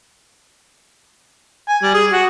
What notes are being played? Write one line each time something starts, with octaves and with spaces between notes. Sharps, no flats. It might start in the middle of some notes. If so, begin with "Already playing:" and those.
G#5
G3
G#4
F#4